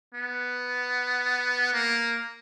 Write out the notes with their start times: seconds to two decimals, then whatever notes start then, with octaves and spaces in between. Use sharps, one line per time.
0.14 B3
1.73 A#3